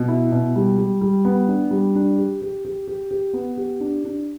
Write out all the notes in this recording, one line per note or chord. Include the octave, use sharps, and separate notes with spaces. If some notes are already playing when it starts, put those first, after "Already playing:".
Already playing: B2
E4
B2
G3
G3
G3
B3
D4
G3
D4
G4
G4
G4
G4
G4
B3
G4
D4
D4